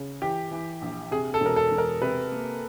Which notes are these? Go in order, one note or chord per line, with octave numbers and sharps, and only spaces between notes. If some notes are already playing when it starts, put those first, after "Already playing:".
Already playing: C#3
E3 G4
E3
A#1
C3 G#4
A4
E1 A#4
A4
E1
A#4
C3 B4
A#3